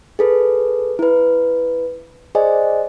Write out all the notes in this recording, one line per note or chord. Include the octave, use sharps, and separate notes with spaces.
G#4 A4 B4
E4 B4
G#4 C5 D5 D#5 G#5